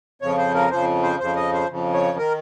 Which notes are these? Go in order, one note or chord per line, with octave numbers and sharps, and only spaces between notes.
F2 C#3 F3 C#5
C5
A#4
F2 C#3 F3 C5
C5
F2 C#3 F3 C5
D#5
C5
F2 C#3 F3
C#5
D#3 A#4